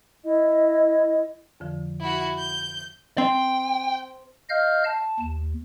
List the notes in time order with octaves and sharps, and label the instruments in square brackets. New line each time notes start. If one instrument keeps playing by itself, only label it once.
[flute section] E4 D#5
[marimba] F2 D3 F3
[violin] E4 F#4
G6
[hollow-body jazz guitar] C4 [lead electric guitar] G5
[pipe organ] D#5 F5 F6 G6
A5
D#2